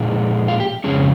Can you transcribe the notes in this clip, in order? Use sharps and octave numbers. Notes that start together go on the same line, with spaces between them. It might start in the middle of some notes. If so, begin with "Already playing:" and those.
Already playing: A#2 F3 G#3 D#4
F4
G4
F2 C#3 G#3 C#4 G#4